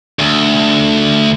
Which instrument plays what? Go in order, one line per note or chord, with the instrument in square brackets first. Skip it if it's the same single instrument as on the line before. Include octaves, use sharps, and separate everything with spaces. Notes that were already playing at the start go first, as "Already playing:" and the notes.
[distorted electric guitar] D2